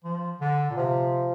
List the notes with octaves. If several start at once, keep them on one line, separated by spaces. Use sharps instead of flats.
F3
D3
A#2
C3 F3